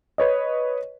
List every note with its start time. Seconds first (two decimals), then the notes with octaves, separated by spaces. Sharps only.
0.18 B4 C#5 D#5